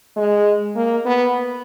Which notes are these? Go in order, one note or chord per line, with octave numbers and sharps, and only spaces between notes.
G#3
A#3
B3